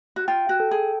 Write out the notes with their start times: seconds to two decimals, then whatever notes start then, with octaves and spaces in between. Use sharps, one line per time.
0.16 F#4
0.28 F4 G5
0.49 F#4
0.60 A4
0.71 G#4